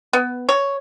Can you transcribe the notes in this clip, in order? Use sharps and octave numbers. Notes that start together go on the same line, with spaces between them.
B3
C#5